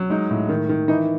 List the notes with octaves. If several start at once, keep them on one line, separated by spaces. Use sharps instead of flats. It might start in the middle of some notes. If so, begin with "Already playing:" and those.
Already playing: F#3
G#3 D#4
A2
D#3
D#3
E3 D#4